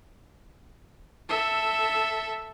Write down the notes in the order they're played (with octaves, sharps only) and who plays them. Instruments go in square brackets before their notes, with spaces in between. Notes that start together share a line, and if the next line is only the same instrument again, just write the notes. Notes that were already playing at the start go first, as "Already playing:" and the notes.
[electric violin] A4 E5